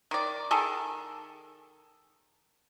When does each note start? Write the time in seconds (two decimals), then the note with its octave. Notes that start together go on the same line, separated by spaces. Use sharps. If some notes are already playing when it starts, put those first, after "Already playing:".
0.11 D#3 D5
0.51 D#3 G#4 A4